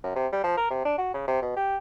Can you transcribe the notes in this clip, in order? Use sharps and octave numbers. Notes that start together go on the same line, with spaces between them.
F#2
C3
G3
F3
A#4
C3
D4
F#4
C#3
C3
B2
G4